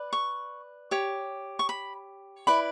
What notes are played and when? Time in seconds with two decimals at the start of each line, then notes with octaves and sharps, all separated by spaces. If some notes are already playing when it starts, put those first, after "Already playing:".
Already playing: B4 D5
0.13 C#6
0.91 G4 C#5
1.59 C#6
1.69 B5
2.47 E4 B4 D5 B5